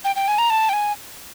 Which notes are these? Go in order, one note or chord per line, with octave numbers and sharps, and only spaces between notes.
G5
G5
G#5
A#5
A5
G5
G#5